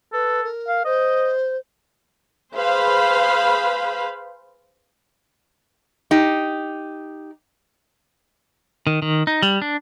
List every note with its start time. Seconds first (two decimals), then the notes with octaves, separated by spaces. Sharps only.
0.13 A4 B4
0.44 A#4
0.68 F5
0.85 C5 D#5
2.55 G#4 B4 C5 F5 B5
6.11 D#4 G4
8.87 D#3
9.02 D#3
9.27 D#4
9.43 G3
9.62 D4